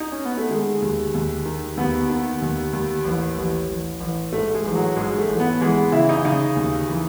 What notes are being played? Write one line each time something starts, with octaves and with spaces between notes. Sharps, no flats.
D#4
C#4
B3
A3
D#3 G#3
D#2
D#2
D#3
D#2 B3
D#3
D#2
D#2
A1
A1
A1
A1
G#2 A3
G#3
A1
F#3
G#2 G#3
A3
A1
B3
E3 G#3
B3
C#3 E4
D#4
C#3 D#4
D#2
E3